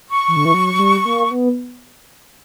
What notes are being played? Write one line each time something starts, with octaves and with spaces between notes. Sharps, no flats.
C#6
E3
D3
E3
F#3
F#3
G3
A#3
B3